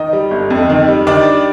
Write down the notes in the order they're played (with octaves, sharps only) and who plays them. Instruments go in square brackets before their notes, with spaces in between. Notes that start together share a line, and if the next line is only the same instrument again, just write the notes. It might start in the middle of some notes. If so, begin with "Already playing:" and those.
Already playing: [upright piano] D#3 D#4 D#5
G3
G1
F2
D#3
G3
D#3 D4 D5
G3